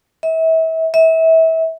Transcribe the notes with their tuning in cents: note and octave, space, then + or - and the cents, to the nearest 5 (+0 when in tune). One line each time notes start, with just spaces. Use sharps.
E5 -35
E5 -30